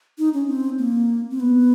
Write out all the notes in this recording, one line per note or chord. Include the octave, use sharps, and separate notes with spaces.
D#4
C#4
C4
A#3
C4
B3